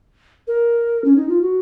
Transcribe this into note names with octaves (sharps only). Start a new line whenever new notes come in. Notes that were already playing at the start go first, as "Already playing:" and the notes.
A#4
C#4
D#4
F4
F#4